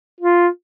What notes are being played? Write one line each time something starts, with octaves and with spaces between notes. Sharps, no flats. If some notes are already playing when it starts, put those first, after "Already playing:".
F4